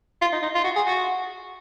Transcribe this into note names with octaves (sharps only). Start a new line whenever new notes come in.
F4
D#4
D#4
F4
F#4
G#4
F#4